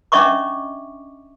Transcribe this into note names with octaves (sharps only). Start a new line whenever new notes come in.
C#4 D4 D#5 E5 C#6 D6